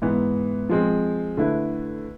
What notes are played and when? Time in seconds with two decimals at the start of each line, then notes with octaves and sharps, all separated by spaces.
0.02 G#2 E3 B3
0.69 F3 G#3 C4
1.37 D3 A3 E4 B4